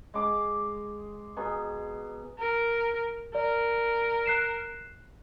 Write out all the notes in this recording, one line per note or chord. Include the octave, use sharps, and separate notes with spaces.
G#3 D6
B2 G#4 A#5
A#4
A#4 D5
F#6 C7 E7